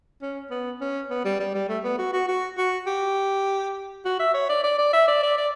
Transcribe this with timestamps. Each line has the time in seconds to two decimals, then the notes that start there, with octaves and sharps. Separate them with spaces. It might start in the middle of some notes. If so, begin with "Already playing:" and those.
0.22 C#4
0.51 B3
0.81 C#4
1.10 B3
1.25 G3
1.40 G3
1.54 G3
1.69 A3
1.84 B3
1.99 F#4
2.13 F#4
2.28 F#4
2.58 F#4
2.87 G4
4.05 F#4
4.20 E5
4.34 C#5
4.49 D5
4.64 D5
4.78 D5
4.93 E5
5.08 D5
5.23 D5
5.38 D5